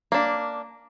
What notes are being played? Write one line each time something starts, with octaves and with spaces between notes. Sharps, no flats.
A#3 D4